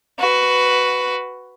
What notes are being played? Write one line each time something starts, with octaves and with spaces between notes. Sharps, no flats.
F#4 B4